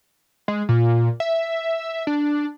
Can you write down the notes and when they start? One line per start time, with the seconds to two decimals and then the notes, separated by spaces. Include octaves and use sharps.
0.48 G#3
0.69 A#2
1.20 E5
2.07 D4